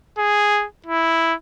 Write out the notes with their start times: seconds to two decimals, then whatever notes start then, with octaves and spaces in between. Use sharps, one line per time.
0.19 G#4
0.86 E4